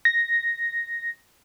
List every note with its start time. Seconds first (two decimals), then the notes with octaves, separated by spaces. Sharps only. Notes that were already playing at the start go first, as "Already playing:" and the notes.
0.05 A#6